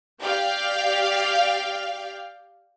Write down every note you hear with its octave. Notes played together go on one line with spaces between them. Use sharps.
G4 D5 F5 G5